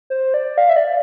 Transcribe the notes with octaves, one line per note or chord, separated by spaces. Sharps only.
C5
D5
F5
E5
D5